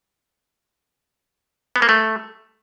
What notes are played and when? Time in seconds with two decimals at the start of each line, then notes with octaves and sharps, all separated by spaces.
1.76 B3
1.82 A#3
1.89 A3